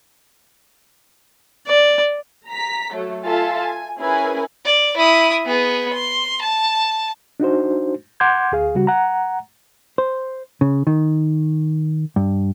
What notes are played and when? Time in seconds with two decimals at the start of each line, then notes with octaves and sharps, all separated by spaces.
1.68 D5
2.47 A#5 B6
2.94 F#3 A3
3.24 F4 A4 E5 F5 G#5 A5
3.58 G#5
3.98 C#4 E4 G#4 A#4 B4 G#5
4.65 D5
4.97 E4 D#6
5.45 B3 G#4
5.94 C6
6.42 A5
7.40 D4 D#4 F#4 C5
8.20 F#5 C6 D6 G6 G#6
8.52 D2 G#4 F5
8.75 C#3 G3 F#4
8.87 F#5 A#5
9.98 C5
10.61 C#3
10.87 D#3
12.16 G2